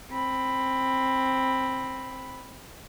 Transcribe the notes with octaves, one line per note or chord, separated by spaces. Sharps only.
C4 B5